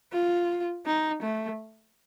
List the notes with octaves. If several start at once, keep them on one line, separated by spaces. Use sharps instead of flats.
F4
D#4
A3